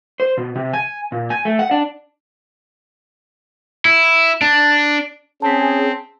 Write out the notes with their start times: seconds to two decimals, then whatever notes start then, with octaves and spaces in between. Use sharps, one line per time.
0.20 C5
0.38 B2
0.56 C3
0.73 G#5
1.12 A#2
1.30 G#5
1.45 A3
1.59 F#5
1.71 D4
3.85 E4
4.42 D4
5.42 C4 C#4 G#4 A5 B6